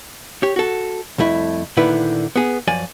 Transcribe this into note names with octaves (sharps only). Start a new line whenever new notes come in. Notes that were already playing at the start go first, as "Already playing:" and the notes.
G4 C#5
F#4 A4
C2 F2 A3 E4
D2 A#2 D3 D#3 E4 B4
B3 G#4
F#2 F3 D5 G#5